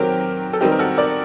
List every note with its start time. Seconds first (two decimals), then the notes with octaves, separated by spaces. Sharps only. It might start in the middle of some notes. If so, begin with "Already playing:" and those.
Already playing: D#3 F#3 C4 G4 A#4
0.53 A4
0.61 D#3 G3 C4 D#4 G4
0.72 A#4
0.79 F#4 A4
0.97 A#4 D5